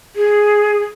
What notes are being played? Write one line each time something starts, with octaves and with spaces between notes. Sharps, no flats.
G#4